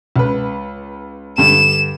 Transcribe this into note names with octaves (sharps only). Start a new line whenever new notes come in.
C#2 B4
G2 D3 E7